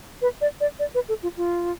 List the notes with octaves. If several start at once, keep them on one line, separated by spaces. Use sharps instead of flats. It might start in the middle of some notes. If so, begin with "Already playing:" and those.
B4
D5
D5
D5
B4
A4
F4
F4